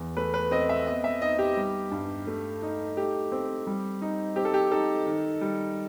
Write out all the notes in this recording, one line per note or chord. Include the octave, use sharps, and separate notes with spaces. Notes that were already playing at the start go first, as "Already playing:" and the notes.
Already playing: E2
A3 B4
B4
C4 D#5
E5
B3 D#5
E5
D#4 D#5
G4
G3
G2
A3
D#4
A3 G4
C4
G3
D#4
C4 G4
A4
G4
D#4 A4
D#3
G3